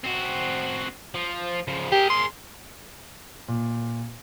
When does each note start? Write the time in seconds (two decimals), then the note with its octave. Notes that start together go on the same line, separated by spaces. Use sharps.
0.04 C4 F#4
1.14 F3
1.67 C#3 F3
1.92 G4 G#4 A#4
2.10 C6
3.48 A#2